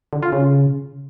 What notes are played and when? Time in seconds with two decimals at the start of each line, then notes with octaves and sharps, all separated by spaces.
0.13 D3
0.23 F4
0.33 C#3